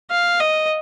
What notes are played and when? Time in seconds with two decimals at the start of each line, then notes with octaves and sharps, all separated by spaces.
0.11 F5
0.41 D#5